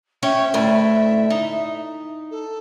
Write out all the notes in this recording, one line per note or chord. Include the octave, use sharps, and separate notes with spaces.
C#4 C#5 E5 G5
D2 A2
D#4
A4